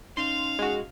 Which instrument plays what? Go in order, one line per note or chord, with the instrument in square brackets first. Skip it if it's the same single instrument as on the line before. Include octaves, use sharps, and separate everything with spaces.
[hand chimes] C#4 D#4 [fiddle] F5 [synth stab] C6
[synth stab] G#3 F#4